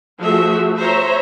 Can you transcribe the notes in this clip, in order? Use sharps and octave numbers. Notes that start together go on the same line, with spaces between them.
F3 A3 F#4 G#4 E5
C5 C#5 E5 A#5